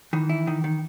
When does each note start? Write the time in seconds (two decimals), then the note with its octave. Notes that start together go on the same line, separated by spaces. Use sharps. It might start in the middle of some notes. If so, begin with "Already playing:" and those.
0.13 D#3 E3
0.29 E4
0.47 D#3
0.64 D#3